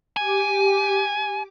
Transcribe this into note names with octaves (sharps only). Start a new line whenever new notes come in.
G4 G#5 D6